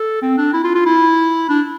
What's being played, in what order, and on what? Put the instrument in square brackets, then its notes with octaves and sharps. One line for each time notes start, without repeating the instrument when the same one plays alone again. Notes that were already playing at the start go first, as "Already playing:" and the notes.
Already playing: [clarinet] A4
C4
D4
E4
F4
F4
E4
D4